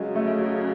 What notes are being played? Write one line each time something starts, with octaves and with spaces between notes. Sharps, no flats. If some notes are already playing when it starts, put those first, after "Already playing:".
Already playing: C#3 F#3 G#3
A3
F#3